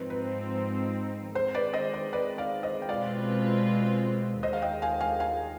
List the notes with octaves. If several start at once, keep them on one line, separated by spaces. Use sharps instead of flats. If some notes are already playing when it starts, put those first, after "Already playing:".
Already playing: G#2 F3 C4 D#4 B4
B4
D#3 G#3 C4 C5
B4 D5
C5 D#5
C5
B4 D5
D5 F5
C5 D#5
G5
B2 G#3 C4 F4 B4 D5 F5
D#2 D#3 G#3 C5 D#5
F5
D#5 G5
F5 G#5
F5 G#5
F5 G#5